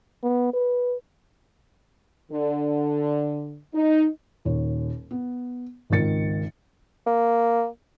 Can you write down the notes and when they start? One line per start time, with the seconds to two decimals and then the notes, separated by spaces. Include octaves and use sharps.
0.23 B3
0.54 B4
2.32 D3
3.74 D#4
4.45 D#1 D#2 C#5
5.11 B3
5.90 G#1 C#2 G#2 D#3 A6 C#7
7.07 A#3